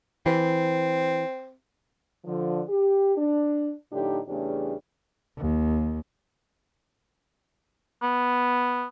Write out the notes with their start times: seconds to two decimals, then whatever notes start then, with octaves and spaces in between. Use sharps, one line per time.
0.26 E3 C4
2.25 D3 F3
2.68 G4
3.16 D4
3.92 A2 D3 F3 D4 D#4 G4
4.27 E2 C#3 A3 C#4 D4 G4
5.37 D#2
8.02 B3